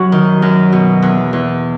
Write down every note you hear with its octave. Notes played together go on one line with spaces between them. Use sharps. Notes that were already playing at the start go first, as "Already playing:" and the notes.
Already playing: F#2 F#3 F#4
D#3
F#2
B2
E2
E2